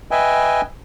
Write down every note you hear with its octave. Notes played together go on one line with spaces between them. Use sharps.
B4 D#5 E5 G5 G#5